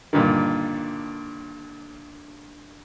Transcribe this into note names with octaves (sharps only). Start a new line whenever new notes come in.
G2 A#2 D3 D#3